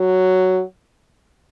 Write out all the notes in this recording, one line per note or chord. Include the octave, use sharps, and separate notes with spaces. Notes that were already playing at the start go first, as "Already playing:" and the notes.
Already playing: F#3